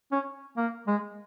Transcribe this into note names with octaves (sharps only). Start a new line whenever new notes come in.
C#4
A#3
G#3